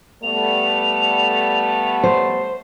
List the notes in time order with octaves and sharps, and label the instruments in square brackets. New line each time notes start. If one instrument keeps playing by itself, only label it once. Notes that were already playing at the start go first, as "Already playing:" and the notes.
[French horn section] G3 A3 B3 [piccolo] F7
[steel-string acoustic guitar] C5